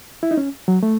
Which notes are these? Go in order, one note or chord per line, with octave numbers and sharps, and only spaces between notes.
E4
D#4
C#4
F#3
A3